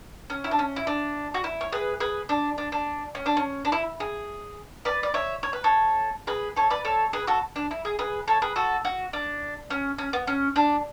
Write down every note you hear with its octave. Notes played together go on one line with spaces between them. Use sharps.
C#4
E4
D4
C#4
E4
D4
F#4
E4
C#5
G#4 B4
G#4 B4
D4
D4
D4
C#4
D4
C#4
D4
E4
G#4
B4 D5
D5
C#5 E5
C#5
B4
A4 C#5
G#4 B4
A4 C#5
B4 D5
A4 C#5
G#4 B4
F#4 A4
D4
E4
G#4
G#4 B4
A4 C#5
G#4 B4
F#4 A4
F#4
D4
C#4
C#4
B3
C#4
D4